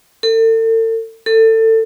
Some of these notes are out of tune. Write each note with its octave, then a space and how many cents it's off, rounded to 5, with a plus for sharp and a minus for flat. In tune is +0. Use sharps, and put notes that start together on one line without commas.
A4 +40
A4 +25